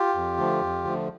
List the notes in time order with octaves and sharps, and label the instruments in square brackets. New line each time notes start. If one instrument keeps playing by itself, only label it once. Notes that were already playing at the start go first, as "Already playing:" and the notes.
Already playing: [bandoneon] F4 G4
F2
D3 F3 A3
F2
D3 F3 A3